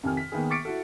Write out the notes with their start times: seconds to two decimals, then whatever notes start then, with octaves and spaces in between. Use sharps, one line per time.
0.03 F2 C3 D#3 G#5 F6
0.17 B6
0.32 D#3 A#3 B3 G#4
0.50 C#6 D6 A6 B6 C#7 D7
0.65 E4 F#4 A4